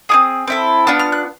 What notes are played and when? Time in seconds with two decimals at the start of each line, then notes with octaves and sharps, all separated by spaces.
0.09 C4 E4 G#4 D#6
0.47 C4 E4 A4
0.87 B3 D4 F4 E6
0.99 F6
1.12 F#6